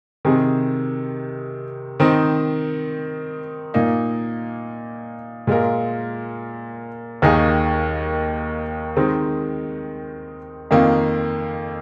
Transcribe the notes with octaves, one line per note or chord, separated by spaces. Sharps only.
C3 D#3 C4 G#4
D#3 C4 D#4
A#2 A#3 D#4
A#2 G#3 F4 A#4
D#2 D#3 A#3 D#4 G#4
D#3 G#3 C4 D#4
F2 D#3 A#3 F4